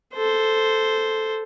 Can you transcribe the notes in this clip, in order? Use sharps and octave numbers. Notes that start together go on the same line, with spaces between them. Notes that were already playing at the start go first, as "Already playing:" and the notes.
A4 C5